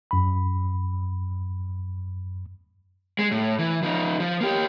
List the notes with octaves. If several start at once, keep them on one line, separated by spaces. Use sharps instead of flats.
F#2 B5
G#3
A2
E3
F3 D#4
F3
A#3 G4